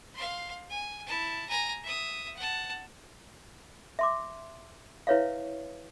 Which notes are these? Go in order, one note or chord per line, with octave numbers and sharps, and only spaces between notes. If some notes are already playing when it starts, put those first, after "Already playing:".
F5 C6
G#5
E4 A5
G#5 A#5
E5 D#6
F#5 A5
E5 C6 D6
E4 B4 C#5 E5 F5